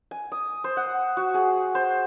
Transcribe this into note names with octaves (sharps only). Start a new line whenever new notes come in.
G#5
D#6
C5
F#5
F#4
G#4
C5